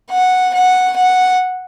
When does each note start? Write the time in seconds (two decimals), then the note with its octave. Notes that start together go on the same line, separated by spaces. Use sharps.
0.11 F#5
0.54 F#5
0.96 F#5